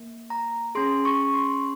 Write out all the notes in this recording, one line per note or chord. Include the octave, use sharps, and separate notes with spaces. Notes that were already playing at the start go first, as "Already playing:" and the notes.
Already playing: A#3
A#5
C#4 G#4 C6
C#6
C6